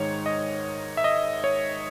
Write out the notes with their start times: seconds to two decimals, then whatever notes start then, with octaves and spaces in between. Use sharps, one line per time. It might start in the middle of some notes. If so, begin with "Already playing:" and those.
Already playing: G#2 D#3 G#3 D#4 C#5
0.26 D#5
0.97 E5
1.04 D#5
1.44 C#5